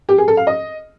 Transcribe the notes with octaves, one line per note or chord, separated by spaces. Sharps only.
G4
G#4
A4
F5
D#5